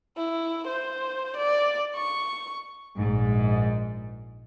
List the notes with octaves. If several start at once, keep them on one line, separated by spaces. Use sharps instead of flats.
E4
C5
D5
C#6
A#1 G#2